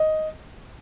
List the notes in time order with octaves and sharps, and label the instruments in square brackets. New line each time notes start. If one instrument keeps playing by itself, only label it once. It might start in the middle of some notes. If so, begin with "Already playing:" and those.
Already playing: [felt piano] D#5